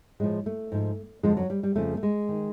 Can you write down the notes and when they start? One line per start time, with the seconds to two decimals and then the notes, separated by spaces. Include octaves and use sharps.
0.20 A2 F3 G#3
0.46 A3
0.72 G#2 F3
1.23 F2 D3 F3 G#3
1.37 F#3
1.50 G3
1.63 G3
1.76 F2 C#3 F3 A3
1.97 A3
2.03 G#3
2.29 D#3